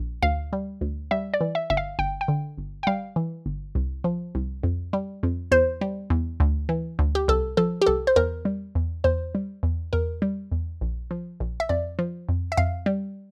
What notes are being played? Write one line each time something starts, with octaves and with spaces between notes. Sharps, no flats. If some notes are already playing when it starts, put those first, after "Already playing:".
Already playing: A#1
D2 F5
G3
D2
G3 E5
D5
E3
E5
G1 E5
F5
G1 G5
G5
D3
G1
G5
G3 F5
E3
G1
C2
F3
C2
F2
G3
F2
E2 C5
G3
E2
D2
E3
D2
G4
C2 A4
F3 A4
G4
C2 A4
C5
E2 A#4
G3
E2
E2 C5
G3
E2
E2 A#4
G3
E2
A#1
F3
A#1
E5
F2 D5
F3
F2
E5
F2 F5
G3